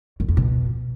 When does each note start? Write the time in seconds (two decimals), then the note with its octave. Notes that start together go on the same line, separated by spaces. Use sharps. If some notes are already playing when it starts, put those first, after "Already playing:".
0.20 F#2
0.28 F2
0.37 B2